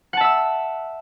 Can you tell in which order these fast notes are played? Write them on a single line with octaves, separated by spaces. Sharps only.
F#5 A5 E5 E6